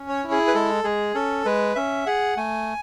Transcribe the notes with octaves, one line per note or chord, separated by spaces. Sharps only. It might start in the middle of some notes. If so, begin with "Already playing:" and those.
Already playing: C#4
C#5
E4
G#4
B4
G#3 A4
G#3 G#4
C#4 A4
G#3 B4
C#4 E5
G#4 F#5
A3 G#5